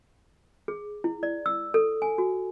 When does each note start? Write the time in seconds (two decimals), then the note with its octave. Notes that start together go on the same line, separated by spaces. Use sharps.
0.68 G#4
1.04 E4
1.23 D5
1.46 E6
1.74 A4
2.02 G#5
2.18 F#4